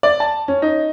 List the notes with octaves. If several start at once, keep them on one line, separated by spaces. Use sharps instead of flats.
D5
A5
C#4
D#4